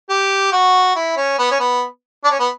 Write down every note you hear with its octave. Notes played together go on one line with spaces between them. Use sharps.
G4
F#4
E4
C#4
B3
C#4
B3
D4
C#4
B3